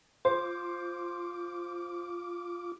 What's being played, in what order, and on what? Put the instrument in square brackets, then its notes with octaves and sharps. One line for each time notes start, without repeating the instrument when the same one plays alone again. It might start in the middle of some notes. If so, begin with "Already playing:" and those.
[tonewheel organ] F4 D6 [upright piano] C5